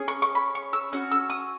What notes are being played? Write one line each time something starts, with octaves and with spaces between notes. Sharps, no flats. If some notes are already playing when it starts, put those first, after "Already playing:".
Already playing: C#4 G#4
C#6
C#6
B5
C#6
E6
C#4 F#4
E6
D#6